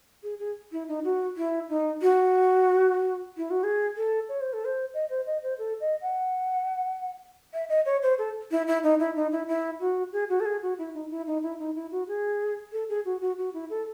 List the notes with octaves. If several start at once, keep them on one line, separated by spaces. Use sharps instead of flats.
G#4
G#4
E4
D#4
F#4
E4
D#4
F#4
E4
F#4
G#4
A4
C#5
C5
A4
C5
D#5
C5
D#5
C5
A4
D#5
F#5
E5
D#5
C#5
C5
A4
E4
E4
D#4
E4
D#4
E4
E4
F#4
G#4
F#4
A4
G#4
F#4
E4
D#4
E4
D#4
E4
D#4
E4
F#4
G#4
A4
G#4
F#4
F#4
F#4
E4
A4